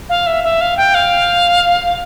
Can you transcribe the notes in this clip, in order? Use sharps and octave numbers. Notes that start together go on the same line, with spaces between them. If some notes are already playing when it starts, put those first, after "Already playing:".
F5
E5
E5
F5
G5
F5